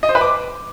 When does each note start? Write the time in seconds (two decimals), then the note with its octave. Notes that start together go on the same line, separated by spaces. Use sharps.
0.03 D#5
0.09 C5
0.15 B4
0.21 D6